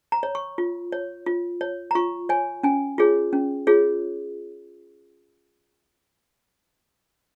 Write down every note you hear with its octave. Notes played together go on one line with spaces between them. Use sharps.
A#5
C#5
C#6
F4
C#5
F4
C#5
A#5
F4 C#6
C#5 G#5
C#4 G#5
F4 G#4 C#5
C#4
F4 G#4 C#5